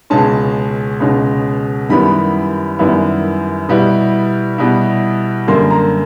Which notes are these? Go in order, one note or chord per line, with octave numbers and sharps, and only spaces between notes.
C#2 B2 G#3 C#4 A5
C#2 B2 G#3 C#4
F#2 D#3 G3 B3 E4 B5
F#2 D#3 G3 B3 E4
B2 G3 B3 E4
B2 G3 B3 E4
F#2 D3 G3 A#3 C6
A#5